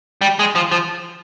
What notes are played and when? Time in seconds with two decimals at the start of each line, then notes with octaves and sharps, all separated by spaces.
0.21 G3
0.39 G#3
0.55 F3
0.72 F3